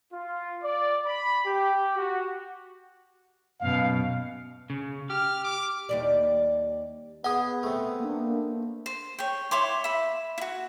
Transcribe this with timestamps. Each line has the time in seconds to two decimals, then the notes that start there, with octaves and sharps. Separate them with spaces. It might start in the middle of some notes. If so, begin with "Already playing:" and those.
0.12 F4
0.62 D5
1.06 B5
1.46 G4
1.96 F#4
3.60 F#2 B2 F5
4.70 C#3
5.10 G4 F6
5.44 D6
5.89 D#2 G3 D5
7.24 B3 G#4 D#5 F#5 D#6
7.63 C3 A3
8.00 A#3 D4
8.86 C5
9.19 C#5 G5
9.51 E4 C#5 C6 D6
9.84 E5 B5
10.38 E4 F#4